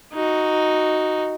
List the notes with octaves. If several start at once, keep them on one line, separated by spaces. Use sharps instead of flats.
D#4 F#4